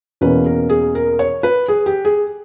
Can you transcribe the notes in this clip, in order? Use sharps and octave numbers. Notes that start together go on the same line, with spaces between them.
E2 B2 A#3 C#4 B4
A#4
G#4
A#4
C#5
B4
G#4
G4
G#4